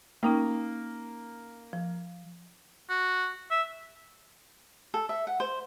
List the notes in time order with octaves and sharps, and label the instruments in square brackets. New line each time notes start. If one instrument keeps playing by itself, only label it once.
[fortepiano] A#3 [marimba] C#4 D#4 G5
[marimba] F3
[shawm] F#4
E5
[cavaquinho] A4
E5
F#5
C5